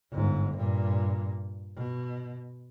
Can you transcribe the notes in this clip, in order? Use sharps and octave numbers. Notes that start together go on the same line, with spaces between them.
G1 G#2
G2 A#2
B2